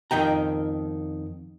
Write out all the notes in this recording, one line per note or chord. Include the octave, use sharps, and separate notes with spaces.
F2 D#3 G5 A#5